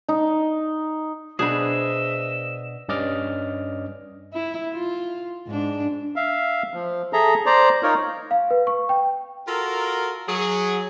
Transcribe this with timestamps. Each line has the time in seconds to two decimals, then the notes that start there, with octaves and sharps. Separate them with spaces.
0.09 D#4
1.39 B2 D4 G#4 C5 D#5 E5 B5 E7
2.89 G2 C#4 D5 D#5 D6 F6
4.34 E4
4.73 F4
5.47 G#2 D4
6.16 E5 F5
6.74 F3
7.13 G#4 A4 E5 A#5
7.46 C5 D5 A#5
7.83 D#4 F4 A#4 C#5
8.31 F5
8.51 B4
8.67 C#6
8.89 G5
9.48 F4 F#4 A4 A#4
10.29 F#3 G#4